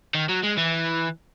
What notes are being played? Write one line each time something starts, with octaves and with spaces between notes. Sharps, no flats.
D#3
F#3
G#3
E3